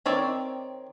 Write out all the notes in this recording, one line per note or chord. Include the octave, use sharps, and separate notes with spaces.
D#3 C4 C#5 D5